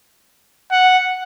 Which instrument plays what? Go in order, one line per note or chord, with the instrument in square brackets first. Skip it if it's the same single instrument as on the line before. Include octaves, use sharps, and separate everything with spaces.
[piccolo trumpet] F#5